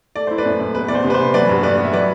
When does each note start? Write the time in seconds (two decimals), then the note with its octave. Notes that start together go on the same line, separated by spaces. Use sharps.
0.16 A3 D5
0.27 E4 C5
0.38 B4 D5
0.45 F#2
0.60 F#2
0.74 E2 B4
0.88 E2 D5
0.95 C5
1.04 C3
1.10 B4
1.14 C5
1.19 E2
1.34 F#3 B4 D5
1.49 G2
1.63 B3 B4 D5
1.78 B3
1.85 E5
1.93 F#3 B4 D5